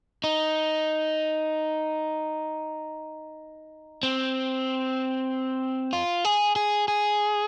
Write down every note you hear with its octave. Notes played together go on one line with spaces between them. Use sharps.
D#4
C4
F4
G#4
G#4
G#4